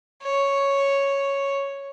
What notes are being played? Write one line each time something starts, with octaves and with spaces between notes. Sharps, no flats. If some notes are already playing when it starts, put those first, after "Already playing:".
C#5